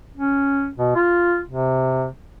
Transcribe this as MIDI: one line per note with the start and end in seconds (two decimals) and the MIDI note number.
0.16 0.69 61
0.77 0.92 47
0.95 1.41 65
1.48 2.07 48